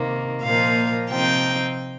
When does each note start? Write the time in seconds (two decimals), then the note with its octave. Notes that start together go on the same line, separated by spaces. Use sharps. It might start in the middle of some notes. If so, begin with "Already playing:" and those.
Already playing: C3 D#3 A#3
0.43 A#2 F3 A#3 D#4 F5
1.08 C3 F3 C4 D#4 G5